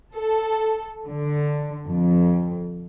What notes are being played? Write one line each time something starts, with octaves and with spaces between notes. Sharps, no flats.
A4
D3
F2